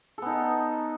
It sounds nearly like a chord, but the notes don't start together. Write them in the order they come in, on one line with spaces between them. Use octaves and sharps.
A4 B3 D#4